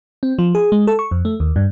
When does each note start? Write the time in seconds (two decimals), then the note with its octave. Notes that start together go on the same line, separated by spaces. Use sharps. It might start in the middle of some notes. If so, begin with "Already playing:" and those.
0.23 C4
0.39 F3
0.55 G#4
0.72 G#3
0.87 A4
0.99 C#6
1.11 F2
1.25 A3
1.40 D#2
1.56 G2